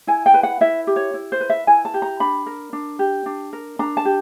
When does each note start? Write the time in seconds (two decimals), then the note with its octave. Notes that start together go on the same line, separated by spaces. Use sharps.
0.07 E4 G#5
0.26 G5
0.34 B4
0.43 F#5
0.61 E4 E5
0.87 G4
0.96 C#5
1.14 E4
1.32 C5
1.40 B4
1.50 E5
1.67 E4 G#5
1.85 A5
1.94 G4
2.02 A#5
2.20 D4 B5
2.46 A#4
2.73 D4
2.99 G4
3.26 D4
3.53 A#4
3.79 D4 A#5
3.97 A5
4.05 G4